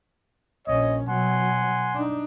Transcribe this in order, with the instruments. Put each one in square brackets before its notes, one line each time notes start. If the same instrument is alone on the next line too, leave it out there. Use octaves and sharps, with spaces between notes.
[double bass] A#1 C#4 [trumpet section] C#5 D#5
[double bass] B2 F#3 [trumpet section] F#5 G#5 C6
[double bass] D4 D#4